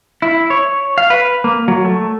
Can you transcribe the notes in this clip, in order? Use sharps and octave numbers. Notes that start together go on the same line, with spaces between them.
E4
C#5
F5
B4
A#3
F#3
A3